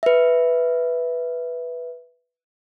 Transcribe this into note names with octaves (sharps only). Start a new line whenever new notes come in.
B4 E5